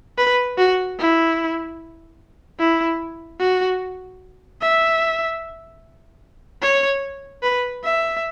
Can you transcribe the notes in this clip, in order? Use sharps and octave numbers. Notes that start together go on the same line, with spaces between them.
B4
F#4
E4
E4
F#4
E5
C#5
B4
E5